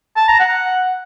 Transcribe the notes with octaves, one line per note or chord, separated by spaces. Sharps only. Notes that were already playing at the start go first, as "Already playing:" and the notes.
A5
A#5
F#5